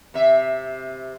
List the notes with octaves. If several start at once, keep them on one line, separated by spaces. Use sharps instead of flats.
C3 E5